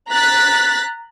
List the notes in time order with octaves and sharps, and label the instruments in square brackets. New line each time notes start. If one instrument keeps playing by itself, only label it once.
[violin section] A#5 F#6 A6 B6